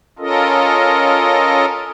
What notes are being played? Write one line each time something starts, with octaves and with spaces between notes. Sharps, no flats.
C#4 F4 A4 A#4 D#5